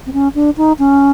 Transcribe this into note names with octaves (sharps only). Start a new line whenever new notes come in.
C4
C#4
D4
D#4
C#4